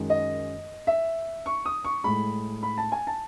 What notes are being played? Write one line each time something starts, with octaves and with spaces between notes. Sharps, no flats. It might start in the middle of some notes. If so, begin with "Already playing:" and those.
Already playing: F#2 D#3 G#3
D#5
E5
C#6
D#6
C#6
A2 G#3 B5
B5
A5
G#5
A5